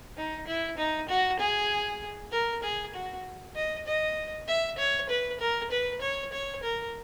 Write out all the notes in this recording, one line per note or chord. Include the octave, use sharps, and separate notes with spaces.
D#4
E4
D#4
F#4
G#4
A#4
G#4
F#4
D#5
D#5
E5
C#5
B4
A#4
B4
C#5
C#5
A#4